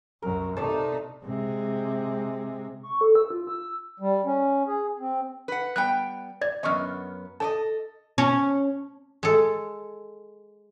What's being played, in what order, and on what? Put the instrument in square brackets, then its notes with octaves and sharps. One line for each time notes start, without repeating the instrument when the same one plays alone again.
[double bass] C2 F#2 [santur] A#4
[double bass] C3 D#4 [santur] A3 D5 A5
[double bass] C3 G#3
[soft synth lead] C#6
A4
E6
F4
E6
[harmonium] G3
C#4
G#4
C4
[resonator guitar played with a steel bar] B4 F#5
[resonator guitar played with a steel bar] G3 B3 G5 [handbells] F#6
[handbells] D5 G#6
[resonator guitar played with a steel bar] F#2 B3 [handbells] D#5 C#6 F6
[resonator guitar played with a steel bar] A4 D5 D#5 [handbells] A5
[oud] C#4
[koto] G#3 A4